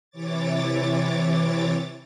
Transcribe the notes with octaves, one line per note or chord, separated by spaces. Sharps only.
C3 E3 C#5 D6 A6